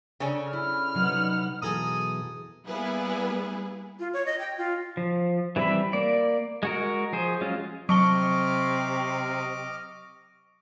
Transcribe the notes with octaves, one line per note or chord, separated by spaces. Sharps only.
C#3 C#4 A4 D5
E4 F6
C3 F#3 D#4 B4 F#5
B2 E3 F#3 G#4 A4 A#5 D#6
G3 A#3 B3 E4 G#4 B4
F4
C#5
D#5
G5
F4
F3
E3 G3 C4 E5 B5
A#3 D5
G#3 F#4 A#4
F3 G#4 C5
F#3 G#3 C#4 F4
C3 F#3 D#5 A5 C#6 D6 F6 G7